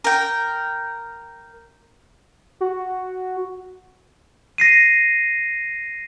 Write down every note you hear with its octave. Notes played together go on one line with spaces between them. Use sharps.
A#4 G5
F#4
A#6 C7 D#7